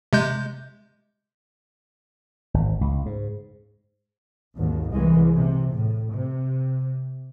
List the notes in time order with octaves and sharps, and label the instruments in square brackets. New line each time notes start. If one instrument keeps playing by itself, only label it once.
[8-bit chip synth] C3 G#3 G6
[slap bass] G#1
C#2
G#2
[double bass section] G#1 D#2
C2 E3 G#3
C3
A2
C3